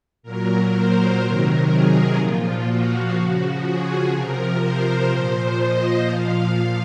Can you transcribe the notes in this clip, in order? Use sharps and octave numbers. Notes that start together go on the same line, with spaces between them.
A#2 F#3 A#4
C5
C3 D#3 F#3 A#4
G#4
A#2 F3 F4
F#4
C#3 F3
G#4
C3 F3 A#4
C5
A#2 F3
D#5
A#2 F3 F5